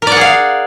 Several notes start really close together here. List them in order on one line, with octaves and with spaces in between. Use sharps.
A#4 D5 F#5 G#4 F5